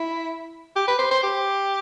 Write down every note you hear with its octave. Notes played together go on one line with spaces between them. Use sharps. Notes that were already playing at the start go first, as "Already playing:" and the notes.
Already playing: E4
G4
B4
C5
C5
G4